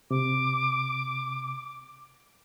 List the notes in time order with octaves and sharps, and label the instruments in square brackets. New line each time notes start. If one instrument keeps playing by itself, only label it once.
[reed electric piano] C3 [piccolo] D6